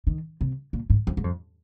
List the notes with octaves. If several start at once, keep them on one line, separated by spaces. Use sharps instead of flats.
D#3
C3
A#2
G#2
F2
G#2
F2